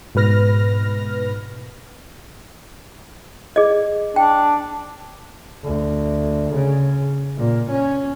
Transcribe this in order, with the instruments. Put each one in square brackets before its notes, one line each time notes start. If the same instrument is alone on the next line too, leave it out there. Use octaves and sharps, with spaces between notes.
[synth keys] G#2 B2 B4 F6 A#6
[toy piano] G#4 D5 D#5
[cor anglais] D4 [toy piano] G5
[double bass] D2
C#3
A#2
C#4